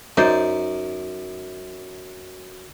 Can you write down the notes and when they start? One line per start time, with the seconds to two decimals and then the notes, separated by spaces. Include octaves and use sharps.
0.17 F#2 D#4 C5 D5